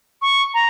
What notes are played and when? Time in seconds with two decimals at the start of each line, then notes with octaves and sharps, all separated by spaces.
0.22 C#6
0.54 A#5